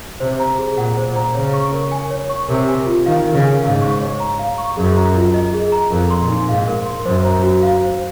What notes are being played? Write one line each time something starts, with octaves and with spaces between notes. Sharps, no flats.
C3 C5
A#5
G#4
A#2 F#5
C5
A#2
A#5
C#3 C#5
C#6
A#4
G#5
C#5
C#6
C3 A#4
G#5
F4
D#3 F5
A#4
C#3
G#5
G#2 F5
C#6
C#5
A#5
F5
C#6
F#2 G#4
A#5
F4
D#5
G#4
A#5
F2 A#4
C6
A#2
D#4
G#2 F5
A#4
C6
F#2 C5
A#5
F#4
F5
C5